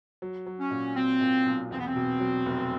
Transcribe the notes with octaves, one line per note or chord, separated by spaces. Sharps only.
F#3
F#3
C#4
A#2
F#3 C4
A#2
B1
E2 C4
B3
C4
B2
F#3
F1